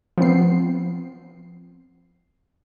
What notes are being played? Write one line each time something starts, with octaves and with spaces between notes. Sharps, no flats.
F3 B3 C4 C7